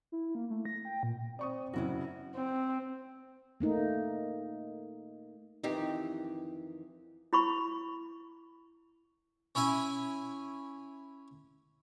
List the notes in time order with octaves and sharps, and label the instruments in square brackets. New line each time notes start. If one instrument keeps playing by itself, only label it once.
[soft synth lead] E4
A#3
A3
A#6
G5
A#2
[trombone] C4 [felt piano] D5 C#6 D#6
[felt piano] F#2 C#3 [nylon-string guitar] C#4 E4 F#4
[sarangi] C4
[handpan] A3 A#3 D#4
[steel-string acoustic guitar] F2 D#3 E3 [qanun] C4 D#4 G4
[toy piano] E4 B5 C#6
[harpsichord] C#4 E4 E5 G#5